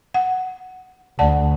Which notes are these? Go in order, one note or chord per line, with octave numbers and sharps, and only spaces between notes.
F#5
D2 D5 F#5 A5